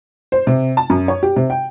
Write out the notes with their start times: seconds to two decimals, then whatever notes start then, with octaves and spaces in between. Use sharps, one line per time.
0.32 C5
0.47 C3
0.77 A5
0.90 F#2
1.08 C#5
1.23 G4
1.36 C3
1.50 G5